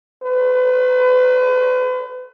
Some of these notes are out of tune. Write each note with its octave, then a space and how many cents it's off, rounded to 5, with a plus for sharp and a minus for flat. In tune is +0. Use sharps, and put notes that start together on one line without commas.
B4 +40